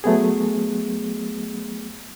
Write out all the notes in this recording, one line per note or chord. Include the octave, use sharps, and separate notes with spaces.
F#3 A3 B3 G#4